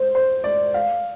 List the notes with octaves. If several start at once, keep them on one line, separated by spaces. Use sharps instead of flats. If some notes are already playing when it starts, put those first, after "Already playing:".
Already playing: C5
C5
D5
F5